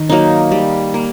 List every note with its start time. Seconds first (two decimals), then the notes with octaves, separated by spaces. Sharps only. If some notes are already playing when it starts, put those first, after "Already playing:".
Already playing: D#3
0.09 F#3 A#3 D#4
0.52 G3
0.94 A#3